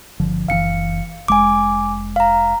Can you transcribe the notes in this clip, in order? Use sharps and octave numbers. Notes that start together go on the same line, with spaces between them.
G1 D3 F3
F#1 C3 E3 F5 C#7
F1 G#3 G#5 D6
F5 A#5